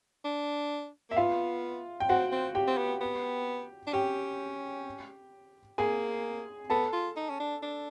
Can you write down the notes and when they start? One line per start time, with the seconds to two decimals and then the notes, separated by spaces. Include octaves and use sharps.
0.25 D4
1.10 A#3 E5
1.16 B3 F4 F5
2.00 G5
2.09 C4 F#4 F#5
2.32 C4
2.55 G4 G5
2.68 C4
2.78 B3
3.01 B3
3.87 D4
3.93 C#4 G4 G5
5.78 A#3 G#4 G#5
6.70 B3 A4 A5
6.93 F4
7.16 D#4
7.30 C#4
7.40 D4
7.62 D4